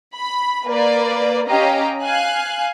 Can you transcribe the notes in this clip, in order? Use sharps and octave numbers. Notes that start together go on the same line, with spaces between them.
B5
A#3 B4 D5
C#4 G4 D#5 F5 A#5
F5 G#5 F#6